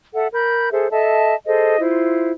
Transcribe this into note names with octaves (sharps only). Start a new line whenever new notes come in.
A4 E5 F#5
A#4 B5 G6
G#4 A4 C5 E5
A4 D#5 E5 A5
G#4 A4 C5 D#5
E4 F4 C5